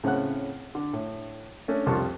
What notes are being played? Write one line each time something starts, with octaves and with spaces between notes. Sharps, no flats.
A2 C#3 C4 C#4 F#5 F#6
D3
A2
A3 C#4 D4
C2 F2 G3 F4 A5 C#6